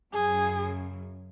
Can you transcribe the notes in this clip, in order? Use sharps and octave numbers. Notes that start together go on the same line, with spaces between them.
F#2 C#3 F#3 G#4